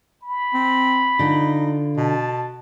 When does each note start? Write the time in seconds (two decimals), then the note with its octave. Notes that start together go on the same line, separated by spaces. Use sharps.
0.23 B5
0.54 C4
1.19 D3 D#4 F4
1.97 B2 A5